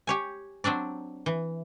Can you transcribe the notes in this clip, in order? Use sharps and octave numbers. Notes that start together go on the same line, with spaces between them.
G4 C#5 G#5
F#3 C4 D4 D5
E3